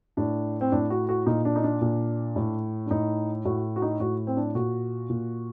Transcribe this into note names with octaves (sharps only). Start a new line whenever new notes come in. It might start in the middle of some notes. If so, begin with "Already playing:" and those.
A2 D4
C4
A2 D4
F#4
F#4
A#2 D#4
D4
D#4
D4
A#2
A2
D4
A2 D#4
A2 F#4
F#4
D#4
A2 F#4
C4
D4
A#2 F#4
A#2